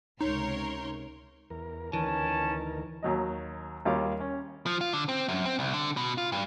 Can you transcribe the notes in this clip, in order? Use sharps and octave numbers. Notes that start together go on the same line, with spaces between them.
C#2 C3 D#4 A#4 C#5 C6
E2 A#4
D2 D#3 E3 C#4 A#4 A5
D#2 F#3 D#5
D#2 G3 F4 A#4 C#5 D6
C#4
F3
F4
D3
C4
F#2
C4
C2
D3
B2
F4
G2